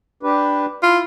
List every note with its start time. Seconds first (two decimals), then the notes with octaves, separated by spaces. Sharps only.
0.23 D4 G4 B4
0.83 E4 F4